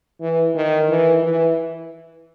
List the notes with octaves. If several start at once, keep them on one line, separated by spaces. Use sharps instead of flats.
E3
D#3
E3
E3